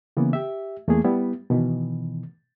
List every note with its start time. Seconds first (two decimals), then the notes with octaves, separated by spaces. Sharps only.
0.17 C#3 E3 A#3 B3
0.33 G4 E5
0.88 E2 A3 A#3 G#4
1.05 G3 B3 E4
1.50 B2 D#3 E3